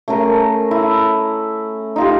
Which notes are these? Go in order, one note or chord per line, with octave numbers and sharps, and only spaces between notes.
A3 C#4 G#4 A#4
E4
D#4 F4 G4